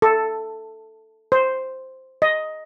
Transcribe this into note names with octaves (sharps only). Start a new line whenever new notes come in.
A4
C5
D#5